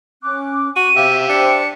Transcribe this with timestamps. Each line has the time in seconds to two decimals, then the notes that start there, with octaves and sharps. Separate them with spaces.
0.23 C#4 D6 F#6
0.76 F#4 D#7
0.96 C3 G4 E5 F5
1.29 D4 C5 G5 C#7